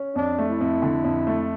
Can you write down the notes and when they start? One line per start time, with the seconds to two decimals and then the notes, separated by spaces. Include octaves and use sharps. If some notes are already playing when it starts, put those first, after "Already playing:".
Already playing: C#4
0.16 F2 D4
0.39 A3
0.49 E4
0.61 F2
0.82 D3
1.04 F2
1.27 A3